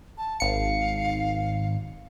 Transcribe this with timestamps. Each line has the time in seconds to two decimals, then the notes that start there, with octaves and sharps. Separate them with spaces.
0.18 A5
0.40 G#1 F5 C#7